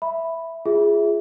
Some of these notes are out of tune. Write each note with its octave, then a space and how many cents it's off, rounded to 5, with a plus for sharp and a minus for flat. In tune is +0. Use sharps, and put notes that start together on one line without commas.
E5 +0 B5 +0
F4 -15 G#4 +0 E5 -10